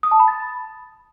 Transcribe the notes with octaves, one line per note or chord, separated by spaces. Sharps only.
D#6
A5
B5
A6